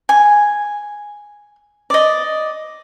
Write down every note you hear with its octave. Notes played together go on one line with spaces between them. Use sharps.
G#5
D5 D#5